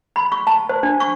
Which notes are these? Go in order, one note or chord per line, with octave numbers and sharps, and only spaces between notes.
B5
C#6
A5
C5
D4
C#6